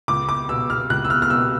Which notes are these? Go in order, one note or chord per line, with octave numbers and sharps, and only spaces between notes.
C#2 D6
D6
B2 E6
F6
C#2 F#6
E6
F6
F6
B2 E6